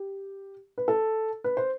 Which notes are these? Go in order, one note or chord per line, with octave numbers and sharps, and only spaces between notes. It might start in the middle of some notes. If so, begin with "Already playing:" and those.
Already playing: G4
B4
A4
B4
C5